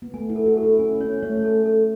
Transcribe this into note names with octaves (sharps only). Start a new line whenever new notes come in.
B3
A3 G#5
E4
A4
F#4
A4
E4
C#4 G#5
C#4 C#5
A3 C#5
A4
A4